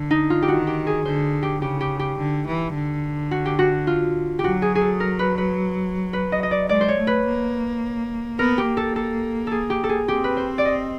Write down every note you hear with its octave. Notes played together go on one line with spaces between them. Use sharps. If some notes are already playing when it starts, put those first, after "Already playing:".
Already playing: D3
D#4
F4
G4
D#3 F#4
G4
G#4
D3 C5
G4
C#3 G4
G4
G4
D3
E3
D3
F#4
G4
F#4
F4
G4
F#3 F#4
G#4
G#4
A4
A#4
B4
B4
B4
D#5
D#5
D5
G#3 D5
C5
C#5
A3
B4
A#3
B3 A#4
G4
A#3
A4
A4
G#4 A4
G4
A4
G#4
C4 G4
B4
C5
D5
D#5